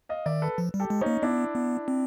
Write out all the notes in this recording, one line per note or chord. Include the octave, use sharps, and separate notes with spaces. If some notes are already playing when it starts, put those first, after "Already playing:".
D#5 F5
D#3 D5 E5
A4 B4
F3
G3
G4 A4
G#3
A#3 C#4 D#4
B3 D4 E4
B3
C4